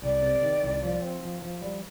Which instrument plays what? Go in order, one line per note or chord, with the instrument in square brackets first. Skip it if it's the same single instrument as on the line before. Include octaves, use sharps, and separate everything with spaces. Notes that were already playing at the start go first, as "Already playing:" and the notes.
[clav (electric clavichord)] C2 [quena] D5
[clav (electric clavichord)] C3
D#3
C2
F3
C4
F3
F3
G3